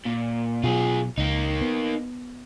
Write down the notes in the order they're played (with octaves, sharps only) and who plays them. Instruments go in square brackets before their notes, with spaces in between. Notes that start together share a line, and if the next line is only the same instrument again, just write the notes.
[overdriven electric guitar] A#2
[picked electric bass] B2 F#3 [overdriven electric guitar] F4 G#4
[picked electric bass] C#2 [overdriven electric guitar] A#3 D#4
[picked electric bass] B3